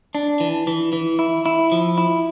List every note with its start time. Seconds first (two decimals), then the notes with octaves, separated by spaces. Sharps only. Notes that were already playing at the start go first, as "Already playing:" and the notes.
0.15 D4
0.40 E3
0.67 E3
0.93 E3
1.19 E4
1.46 E4
1.72 F3
1.98 E4